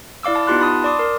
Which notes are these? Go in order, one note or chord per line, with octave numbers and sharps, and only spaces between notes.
E4 D5 F5 D6 E6
F5 A5
B3 D#4 F4 G4 C6 F#6
A5 B5 D#6
D5 C6 D6 D#6
A#4